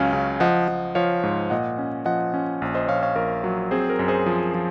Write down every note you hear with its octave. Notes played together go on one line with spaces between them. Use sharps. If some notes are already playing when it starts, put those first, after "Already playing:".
Already playing: C#2 F#3 C#4 F5 G#5
C#3
F3 D#5 F#5
F3
F3 C#5 F5
G#2
A#2 D#5 F#5
C#4
F3 D#5 F#5
C#4
A#1
C5 D#5
A#1 C#5 F5
C#5 F5
A#1 A#4 C#5
F#3
C4 G#4 C5
A#4
F#2
G#4 C5
F3
F3